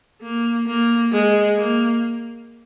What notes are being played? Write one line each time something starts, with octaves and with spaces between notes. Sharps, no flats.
A#3
A#3
G#3
A#3